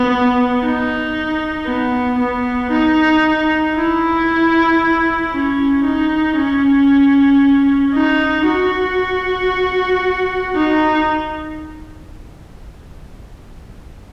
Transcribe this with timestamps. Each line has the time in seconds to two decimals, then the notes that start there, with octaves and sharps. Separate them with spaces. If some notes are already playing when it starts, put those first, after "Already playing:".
Already playing: B3
0.62 D#4
1.66 B3
2.18 B3
2.71 D#4
3.76 E4
5.32 C#4
5.85 D#4
6.37 C#4
7.94 D#4
8.47 F#4
10.55 D#4